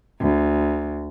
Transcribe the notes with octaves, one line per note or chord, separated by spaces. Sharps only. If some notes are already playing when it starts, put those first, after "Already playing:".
D2